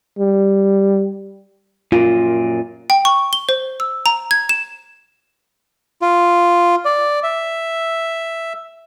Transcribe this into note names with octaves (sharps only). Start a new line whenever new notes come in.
G3
F#2 A#2 F4
G5
C#6
G7
C5
E6
A#5
G#6
E7
F4
D5
E5